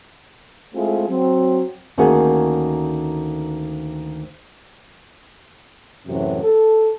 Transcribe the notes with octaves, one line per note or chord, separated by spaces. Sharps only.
G#3 A3 C4 E4 F4 G#4
F#3 C4
D2 D#3 A#3 C#4 F#4 G#4
F#2 A2 C3 E3 F#3
A4